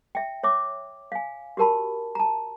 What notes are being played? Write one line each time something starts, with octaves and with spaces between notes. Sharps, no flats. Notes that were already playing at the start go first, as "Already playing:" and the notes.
E5 G5
C#5 E5 D6
F5 G#5
F#4 G4 A#4 A5 B5
A5 A#5